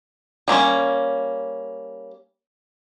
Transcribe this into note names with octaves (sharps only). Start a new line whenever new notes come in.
G3 A#3 B3 C#4